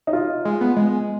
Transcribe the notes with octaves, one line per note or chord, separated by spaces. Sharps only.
D#4
F4
G#3
B3
G#3